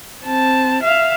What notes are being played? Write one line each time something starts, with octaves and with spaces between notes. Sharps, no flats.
C4 A5
E5 F5